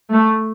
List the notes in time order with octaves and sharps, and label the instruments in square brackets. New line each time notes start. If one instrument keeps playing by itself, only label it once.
[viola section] A3